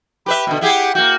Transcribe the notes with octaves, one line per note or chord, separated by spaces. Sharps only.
G4 B4 E5 B5
B2 D3
E4 G4 G#4 F#5
A#3 F#4 G6